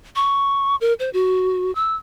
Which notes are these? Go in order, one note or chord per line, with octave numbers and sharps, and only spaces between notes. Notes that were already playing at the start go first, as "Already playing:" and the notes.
C#6
A#4
C5
F#4
E6